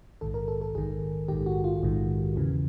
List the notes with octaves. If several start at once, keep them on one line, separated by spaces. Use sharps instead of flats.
A#1 G#2 D#3 A4
A#4
A4
A4
A#1 G#2 D#3 G#4
A#1 G#2 D#3 G4
F#4
F4
A#1 G#2 D#3
E2 C#3 E3